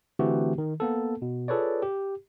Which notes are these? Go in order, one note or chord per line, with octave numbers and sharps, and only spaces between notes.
D3 E3 A3 C4 F#4 G4
D#3
A#3 B3 A4
B2
F4 G#4 A4 B4 C#5 D5
G4